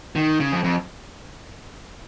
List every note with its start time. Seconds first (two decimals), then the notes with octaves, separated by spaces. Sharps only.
0.16 D#3
0.40 C#3
0.52 F2
0.64 F2